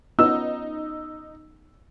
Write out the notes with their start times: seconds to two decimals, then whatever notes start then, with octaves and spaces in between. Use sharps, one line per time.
0.19 B3 C#4 D#4 F4 E6